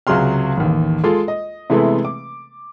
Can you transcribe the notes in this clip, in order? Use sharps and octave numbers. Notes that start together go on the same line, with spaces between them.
C#2 C3 F#3 G#4 C6 F6
A1 D#2
G#3 F4 A4
D#5
C3 E3 G#3 A3 B3
D6